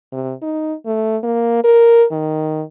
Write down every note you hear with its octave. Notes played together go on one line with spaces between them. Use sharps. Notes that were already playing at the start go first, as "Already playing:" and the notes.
C3
D#4
A3
A#3
A#4
D#3